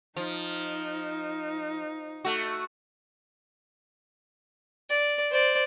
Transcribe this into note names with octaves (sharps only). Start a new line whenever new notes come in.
F3 D#4
A3 F#4
D5
C5 D5